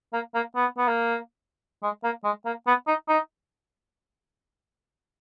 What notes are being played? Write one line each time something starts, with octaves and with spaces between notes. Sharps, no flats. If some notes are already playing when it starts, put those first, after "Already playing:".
A#3
A#3
B3
B3
A#3
G#3
A#3
G#3
A#3
B3
D#4
D#4